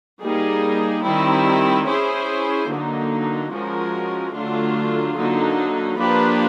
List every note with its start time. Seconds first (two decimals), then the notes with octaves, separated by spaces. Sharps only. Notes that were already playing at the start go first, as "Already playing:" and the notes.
0.22 G3 A#3 D#4 G#4
1.04 D#3 G3 C4 E4
1.86 C#4 E4 G#4 C5
2.69 D3 F#3 A#3 D#4
3.51 F3 G#3 C#4 F#4 A#4
4.34 D3 F#3 A3 D4 F4
5.16 D3 F#3 A#3 D#4
5.98 F3 A#3 D4 G4 B4